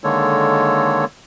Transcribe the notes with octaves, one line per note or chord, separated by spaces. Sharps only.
D3 D#3 G#3 A#3 A4 C#5